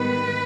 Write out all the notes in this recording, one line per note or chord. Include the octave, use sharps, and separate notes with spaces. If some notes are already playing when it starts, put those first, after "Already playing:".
Already playing: G#2 D#3 G3 B3 B4